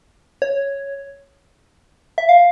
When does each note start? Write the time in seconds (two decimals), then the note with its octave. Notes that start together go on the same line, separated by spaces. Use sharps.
0.42 C#5
2.18 E5
2.29 F5